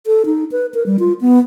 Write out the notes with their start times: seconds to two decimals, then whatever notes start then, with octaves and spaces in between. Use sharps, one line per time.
0.06 A4
0.26 D#4
0.52 B4
0.74 A#4
0.86 G3
0.99 F4
1.21 B3